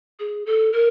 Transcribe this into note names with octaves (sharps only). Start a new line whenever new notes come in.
G#4
A4
A#4